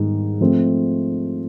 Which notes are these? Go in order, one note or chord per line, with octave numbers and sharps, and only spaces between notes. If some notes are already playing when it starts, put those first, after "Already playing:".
Already playing: G#2 D#3 G3 B3 D#4
F3 A3 C4